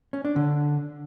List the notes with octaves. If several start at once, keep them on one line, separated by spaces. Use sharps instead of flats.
C#4
D4
D3